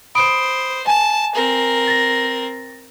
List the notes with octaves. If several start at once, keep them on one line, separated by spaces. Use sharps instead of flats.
C5 B5 D#6 D7
G#5 A5
C4 A#4
A6 A#6